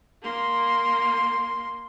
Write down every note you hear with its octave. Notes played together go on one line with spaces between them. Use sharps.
A#3 C6